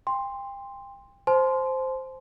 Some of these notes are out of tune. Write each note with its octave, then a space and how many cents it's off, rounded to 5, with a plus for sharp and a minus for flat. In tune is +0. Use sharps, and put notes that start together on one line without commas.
G5 +30 C6 +0
C5 +0 A5 -45 C6 -15